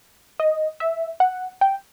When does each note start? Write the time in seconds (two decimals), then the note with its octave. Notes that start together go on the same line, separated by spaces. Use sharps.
0.40 D#5
0.80 E5
1.20 F#5
1.61 G5